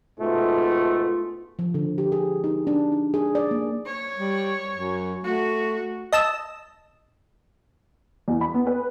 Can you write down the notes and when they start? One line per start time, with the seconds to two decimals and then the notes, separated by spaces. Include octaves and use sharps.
0.19 G#2 B2 A3 F4
1.59 F3
1.74 D3
1.98 G4
2.12 G#4
2.44 D#4
2.67 D4
2.92 D#4
3.14 G#4
3.35 D5
3.51 A#3
3.86 C#5
4.18 G3
4.71 F#2
5.24 A3 F#4
6.13 D#5 A5 E6
8.28 E2
8.41 B5
8.54 B3
8.67 B4